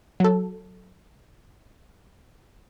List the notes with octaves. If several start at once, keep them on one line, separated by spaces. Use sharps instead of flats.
F#3 A4